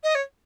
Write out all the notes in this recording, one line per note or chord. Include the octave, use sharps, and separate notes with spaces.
D#5
C#5